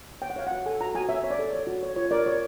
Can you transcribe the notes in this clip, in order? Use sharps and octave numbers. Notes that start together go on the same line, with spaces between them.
C#5 G5
F#5
C#5 F5
F#4 F#5
A4 G#5
F#4 A#5
F#4 G#5
C#5 E5
C#5
D5
A4
C#5
F#4
C#5
F4 C#5
A#4 D5
C#5